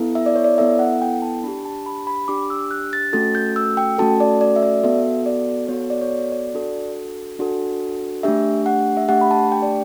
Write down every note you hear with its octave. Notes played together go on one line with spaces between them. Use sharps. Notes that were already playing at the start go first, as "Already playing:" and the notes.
Already playing: B3 E4 A4
E5
D5
C#5
D5
B3 E4 A4 E5
F#5
G5
A5
D4 G4 B5
A5
B5
B5
D4 G4 D6
E6
F#6
A6
A3 C#4 F#4 A4 A6
G6
E6
G5
A3 C#4 F#4 A4 A5
D5
D5
E5
D5
B3 F#4 A4 E5
D5
B3 F#4 A4 C#5
D5
C#5
D5
D5
D4 F#4 A4
D4 F#4 A4
A3 D4 G4 E5
F#5
E5
A3 D4 G4 F#5
B5
A5
G5
D5